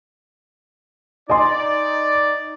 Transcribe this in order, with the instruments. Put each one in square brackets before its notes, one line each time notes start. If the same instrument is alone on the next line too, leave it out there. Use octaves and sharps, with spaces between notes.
[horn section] D#4 D5 [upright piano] D#5 G#5 C6